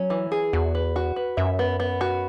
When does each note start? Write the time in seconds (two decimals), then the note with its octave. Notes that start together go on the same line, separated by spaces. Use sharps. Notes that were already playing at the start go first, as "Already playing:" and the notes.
Already playing: F#3 C#4
0.10 E3
0.32 G#4
0.53 E2 F#4
0.75 B4
0.96 F#4
1.16 B4
1.37 F#2 E5
1.59 B3
1.80 B3
2.01 F#4